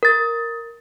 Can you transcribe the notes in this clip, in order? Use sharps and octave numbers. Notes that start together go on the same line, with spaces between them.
A#4 A6